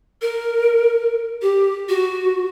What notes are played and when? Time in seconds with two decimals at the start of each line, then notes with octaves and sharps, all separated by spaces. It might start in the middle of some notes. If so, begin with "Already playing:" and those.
0.22 A#4
1.42 G4
1.89 F#4